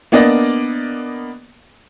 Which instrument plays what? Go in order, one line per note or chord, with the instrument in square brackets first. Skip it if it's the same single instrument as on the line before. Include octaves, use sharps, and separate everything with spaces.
[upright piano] A#3 B3 D4 D5 D#5